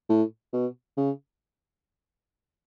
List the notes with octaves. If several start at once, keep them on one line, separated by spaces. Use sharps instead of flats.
A2
B2
C#3